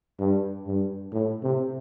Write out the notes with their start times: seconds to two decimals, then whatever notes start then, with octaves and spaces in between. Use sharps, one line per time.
0.20 G2
0.67 G2
1.13 A2
1.43 C3